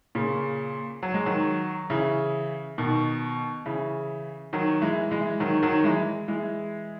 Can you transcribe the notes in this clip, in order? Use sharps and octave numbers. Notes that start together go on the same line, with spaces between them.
A#2 C#3
F#3
G#3
D#3 F#3
C#3 E3
B2 D#3
C#3 E3
D#3 F#3
E3 G#3
E3 G#3
D#3 F#3
D#3 F#3
E3 G#3
E3 G#3